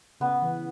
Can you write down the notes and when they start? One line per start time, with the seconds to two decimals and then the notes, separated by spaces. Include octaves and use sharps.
0.20 C#3 B3
0.42 E3